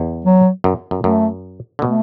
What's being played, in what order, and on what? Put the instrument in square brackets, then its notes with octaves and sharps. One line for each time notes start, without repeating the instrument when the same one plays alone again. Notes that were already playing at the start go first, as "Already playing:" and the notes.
Already playing: [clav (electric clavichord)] E2
[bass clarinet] F#3
[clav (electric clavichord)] F#2
F#2
[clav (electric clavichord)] F#2 [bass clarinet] A3
[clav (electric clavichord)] D3
[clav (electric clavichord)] B2 [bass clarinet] A3